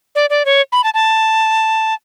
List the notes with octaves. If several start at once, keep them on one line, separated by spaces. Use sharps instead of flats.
D5
D5
C#5
B5
A5
A5